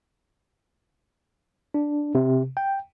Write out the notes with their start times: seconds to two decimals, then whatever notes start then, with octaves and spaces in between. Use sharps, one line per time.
1.74 D4
2.15 C3
2.57 G5